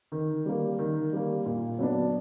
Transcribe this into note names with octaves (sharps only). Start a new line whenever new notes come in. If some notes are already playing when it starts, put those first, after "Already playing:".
D#3
G3 A#3
D#3
G3 A#3
A#2
F#3 B3 D4